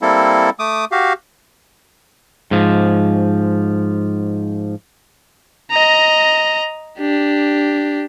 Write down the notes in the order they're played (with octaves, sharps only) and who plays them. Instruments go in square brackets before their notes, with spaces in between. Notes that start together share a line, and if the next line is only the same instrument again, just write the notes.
[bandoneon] G3 A#3 C4 E4 A4
A3 D6 D#6
F#4 G4 F5
[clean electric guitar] G#2 F3
[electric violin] D#5 A#5
D4 G4